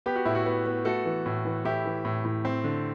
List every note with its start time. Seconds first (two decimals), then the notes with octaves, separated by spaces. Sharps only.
0.06 B3 G4
0.16 F#4
0.25 A2 E4
0.35 F#4
0.46 B3
0.66 B3
0.85 A3 F#4 A4
1.05 E3
1.26 A2
1.45 E3
1.64 A2 E4 G4
1.86 E3
2.05 A2
2.25 A2
2.45 C4
2.64 D3